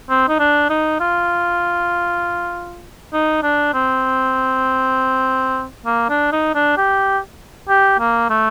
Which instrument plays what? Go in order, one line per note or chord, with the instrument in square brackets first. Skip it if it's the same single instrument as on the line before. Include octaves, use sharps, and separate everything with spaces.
[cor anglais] C4
D#4
D4
D#4
F4
D#4
D4
C4
A#3
D4
D#4
D4
G4
G4
A#3
A3